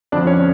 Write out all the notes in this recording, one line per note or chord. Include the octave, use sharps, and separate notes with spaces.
F2 D3 F3 D4 D5
C#4 C#5